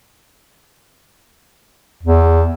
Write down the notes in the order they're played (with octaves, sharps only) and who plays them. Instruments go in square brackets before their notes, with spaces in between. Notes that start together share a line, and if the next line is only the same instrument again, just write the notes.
[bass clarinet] E2